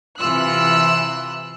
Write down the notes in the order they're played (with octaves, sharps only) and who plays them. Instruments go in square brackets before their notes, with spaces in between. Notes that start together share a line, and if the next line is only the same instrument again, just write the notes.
[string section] C3 E3 F4 E6 F#6